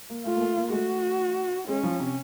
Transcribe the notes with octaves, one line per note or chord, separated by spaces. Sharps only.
A#3
A3 F4
A#3
A3
A#3
G#3
A3 F#4
G#3 C#4
F3
C3